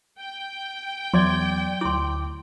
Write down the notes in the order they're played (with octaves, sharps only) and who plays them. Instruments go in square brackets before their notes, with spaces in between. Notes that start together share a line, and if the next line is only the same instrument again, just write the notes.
[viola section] G5
[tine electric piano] E2 D5 G#6 [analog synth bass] F#3 [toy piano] C6
[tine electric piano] D2 D6 [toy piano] E4 C6